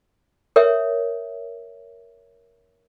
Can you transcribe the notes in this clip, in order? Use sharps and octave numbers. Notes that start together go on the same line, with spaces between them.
A#4 C#5 E5